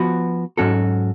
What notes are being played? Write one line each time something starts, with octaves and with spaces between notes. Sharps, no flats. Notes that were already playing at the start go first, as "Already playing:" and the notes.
Already playing: F3 B3 F#4 B4
G#2 F#3 C#4 F#4 A4